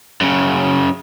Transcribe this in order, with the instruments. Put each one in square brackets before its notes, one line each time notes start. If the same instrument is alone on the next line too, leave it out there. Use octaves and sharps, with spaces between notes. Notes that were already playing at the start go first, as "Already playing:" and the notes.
[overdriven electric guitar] F#2 C#3